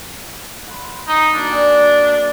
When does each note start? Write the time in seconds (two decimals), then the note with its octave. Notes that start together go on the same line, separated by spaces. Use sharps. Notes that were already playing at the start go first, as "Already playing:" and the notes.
0.68 F#5 B5 C6
1.08 D#4
1.35 A#3 D4 F#4
1.49 D5 F#5 G#5